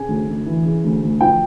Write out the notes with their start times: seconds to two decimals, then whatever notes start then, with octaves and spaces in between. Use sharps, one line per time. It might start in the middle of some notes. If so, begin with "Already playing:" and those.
Already playing: C#3 G#5
0.08 D2
0.28 D2
0.46 E3
0.65 C#3
0.84 D2
1.03 D2
1.21 F3 G5